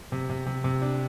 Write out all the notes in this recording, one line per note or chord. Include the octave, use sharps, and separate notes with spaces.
C3
C3
C3
C3
D4